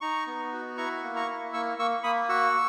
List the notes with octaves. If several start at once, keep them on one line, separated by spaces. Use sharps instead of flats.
D#4 A#5 C#6
B3
F#4
E4 A#5 C#6
A#3
A#5 C#6
E4
A#3 C#6 E6
A#3 C#6 E6
A#3 B5 D#6
F#4 C#6 E6